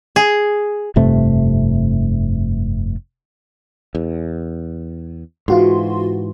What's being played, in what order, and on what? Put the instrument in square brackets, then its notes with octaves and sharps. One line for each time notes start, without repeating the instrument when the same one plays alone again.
[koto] G#4
[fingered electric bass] F1 G2 C3 A3
[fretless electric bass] E2
[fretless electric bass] G#2 E3 [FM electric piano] F4 F#4 C6